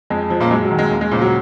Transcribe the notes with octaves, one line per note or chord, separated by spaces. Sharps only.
F2 G#3
F3
A#2 A#3
F#2 G#3
F#3
D#3
G#3
D#2
G#3
A#2 C#3 F3 A#3
F#3